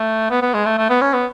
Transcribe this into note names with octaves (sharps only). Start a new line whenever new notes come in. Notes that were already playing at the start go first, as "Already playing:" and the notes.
Already playing: A3
B3
B3
G#3
A3
A3
B3
C#4
B3